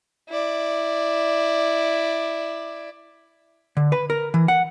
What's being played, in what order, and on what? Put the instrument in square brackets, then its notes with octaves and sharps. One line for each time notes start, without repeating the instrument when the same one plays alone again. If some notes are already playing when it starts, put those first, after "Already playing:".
[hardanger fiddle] E4 D5
[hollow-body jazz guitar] D3
B4
A#4
E3
F#5